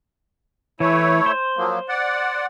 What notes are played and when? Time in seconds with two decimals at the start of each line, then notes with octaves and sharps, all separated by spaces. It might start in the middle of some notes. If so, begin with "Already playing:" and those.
0.80 E3 A3 E4 C#5
1.26 C5
1.57 F3 F#3 A#3
1.89 D5 F#5